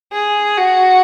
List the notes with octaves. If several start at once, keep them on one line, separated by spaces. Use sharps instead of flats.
G#4
F#4